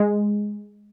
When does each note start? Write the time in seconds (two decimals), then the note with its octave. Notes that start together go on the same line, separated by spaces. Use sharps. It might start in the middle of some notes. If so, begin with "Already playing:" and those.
Already playing: G#3